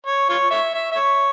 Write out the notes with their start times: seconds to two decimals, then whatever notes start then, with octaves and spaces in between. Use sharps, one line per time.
0.07 C#5
0.29 F4 C#5
0.51 C#5 E5
0.74 E5
0.92 E5
0.96 C#5